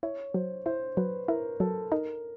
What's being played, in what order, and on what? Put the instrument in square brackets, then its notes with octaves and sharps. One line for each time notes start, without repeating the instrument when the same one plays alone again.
[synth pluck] E4 [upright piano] C#5
[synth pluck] F#3 [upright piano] C5
[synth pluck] E4 [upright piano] C5
[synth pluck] F#3 [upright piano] B4
[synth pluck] E4 [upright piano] A#4
[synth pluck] F#3 [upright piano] A4
[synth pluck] D#4 [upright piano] A#4